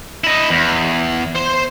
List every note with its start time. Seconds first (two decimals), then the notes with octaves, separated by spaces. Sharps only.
0.24 E4 D#5
0.50 E2
1.36 C5 C6